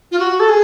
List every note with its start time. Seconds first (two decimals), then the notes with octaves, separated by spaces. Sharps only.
0.11 F4
0.19 F#4
0.39 A4
0.48 G#4